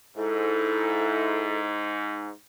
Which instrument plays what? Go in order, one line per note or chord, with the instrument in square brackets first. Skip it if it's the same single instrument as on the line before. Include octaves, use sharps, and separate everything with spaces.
[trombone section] G#2 [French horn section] E4 [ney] A4